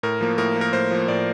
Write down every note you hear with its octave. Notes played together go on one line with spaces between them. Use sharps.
A2 A#4
F3 A#3
A2 A#4
F3 A#3
A#4
A2 C5
F3 A#3
A2 D5